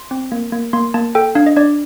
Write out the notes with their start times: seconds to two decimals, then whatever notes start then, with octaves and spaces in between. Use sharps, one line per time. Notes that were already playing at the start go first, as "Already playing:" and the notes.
Already playing: C6
0.11 C4
0.32 A#3
0.52 A#3
0.73 A#3 C6
0.94 A#3 A5
1.15 A4 G5
1.35 D4 F5
1.46 D#5
1.57 D4 D5